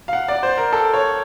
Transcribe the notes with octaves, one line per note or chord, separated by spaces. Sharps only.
F5
F#5
D5
C5
A#4
A4
C#5